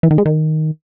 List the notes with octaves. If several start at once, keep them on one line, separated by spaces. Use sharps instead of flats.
E3
D#3
G#3
D#3